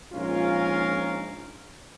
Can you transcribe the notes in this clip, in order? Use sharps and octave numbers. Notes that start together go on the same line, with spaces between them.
A#1 G#2 C#4 F4 A#4 F5